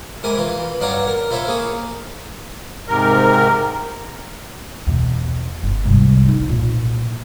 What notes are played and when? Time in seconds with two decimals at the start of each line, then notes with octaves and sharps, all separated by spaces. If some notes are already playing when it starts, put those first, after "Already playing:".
0.23 G#2 E4 A#4 G#5 D6
0.38 E3 F4
0.81 G2 F#3 D4 C#5 F5 A#5
1.07 A#4
1.30 E4 F4 C5 C#5 E5
1.47 A#3 G#4 C#5
2.88 G#2 C3 A#4
4.87 E2 B2
5.63 F#1
5.85 C2 G#2
6.29 D#4
6.46 A#2 F3